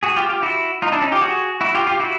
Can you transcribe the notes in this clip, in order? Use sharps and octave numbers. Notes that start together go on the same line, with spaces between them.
F#4 G#4
F4 G4
F4 G4
E4 F#4
D#4 F4
D4 E4
C#4 D#4
F4 G4
F#4 G#4
E4 F#4
F4 G4
F4 G4
E4 F#4